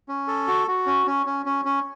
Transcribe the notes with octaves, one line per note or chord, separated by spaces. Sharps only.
C#4
A4
F#4
F#4
C#4
C#4
C#4
C#4
C#4